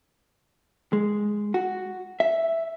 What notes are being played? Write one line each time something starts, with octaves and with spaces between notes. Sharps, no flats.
G#3
F#4
E5